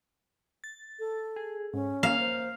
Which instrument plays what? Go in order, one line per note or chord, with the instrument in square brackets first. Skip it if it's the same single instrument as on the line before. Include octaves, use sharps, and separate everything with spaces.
[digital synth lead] A6
[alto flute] A4
[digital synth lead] G#4
[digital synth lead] G#2 [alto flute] C#4
[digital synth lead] A#3 [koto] F5
[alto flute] C5